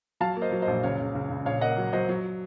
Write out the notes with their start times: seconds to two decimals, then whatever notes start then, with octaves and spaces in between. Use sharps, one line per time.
0.20 F#3 F5 A5
0.36 A#3
0.41 C5 D#5
0.52 F#3
0.62 C5 D#5
0.67 A#1
0.83 C#2 C#5 F5
0.99 C#2
1.15 C#2
1.30 C#2
1.46 A#1 C#5 F5
1.61 A#3 D#5 F#5
1.77 F#3
1.93 F#3 C5 D#5
2.09 F#3